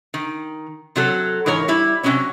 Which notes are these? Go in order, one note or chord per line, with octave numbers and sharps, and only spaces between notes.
D#3
C3 F#3 A4
G#2 E3 A#4 C#5
G3 E4
C3 F3 F#3 C#4 C#5